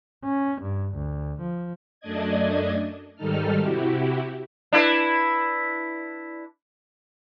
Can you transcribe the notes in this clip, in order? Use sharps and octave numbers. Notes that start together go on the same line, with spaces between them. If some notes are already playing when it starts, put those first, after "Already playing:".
C#4
G2
D2
F3
F#2 A3 D4 D5 D#5 G#6
G#2 D#3 G3 D#4 A4 F6
C3 E4 F#4 G4
D4 E4 B4